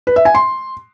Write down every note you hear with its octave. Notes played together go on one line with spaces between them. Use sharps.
B4
E5
G#5
C6